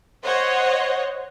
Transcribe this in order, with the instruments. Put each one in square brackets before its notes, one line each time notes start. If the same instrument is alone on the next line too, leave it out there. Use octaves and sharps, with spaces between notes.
[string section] C5 C#5 D#5 F#5